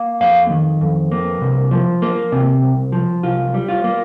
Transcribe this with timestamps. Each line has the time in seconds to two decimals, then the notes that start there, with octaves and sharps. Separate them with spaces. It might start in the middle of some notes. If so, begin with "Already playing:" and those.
Already playing: A#3
0.20 F2 F5
0.50 D#3
0.81 F2
1.12 A#3
1.41 C2
1.71 F3
2.02 A#3
2.32 C3
2.63 C2
2.92 F3
3.23 C2 F4
3.54 G3
3.68 F4
3.84 A#3